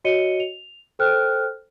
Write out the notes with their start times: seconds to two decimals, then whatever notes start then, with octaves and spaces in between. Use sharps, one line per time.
0.05 F#4 C#5 D#5 C#7 D#7 G7
0.40 F7
0.99 A4 C5 G5 F6 F#6